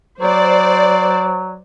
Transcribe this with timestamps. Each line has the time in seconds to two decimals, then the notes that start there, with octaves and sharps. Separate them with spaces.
0.21 F#3 C5 D5